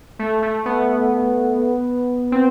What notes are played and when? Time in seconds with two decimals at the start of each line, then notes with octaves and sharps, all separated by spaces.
0.19 A3
0.42 A3
0.66 B3
2.32 C4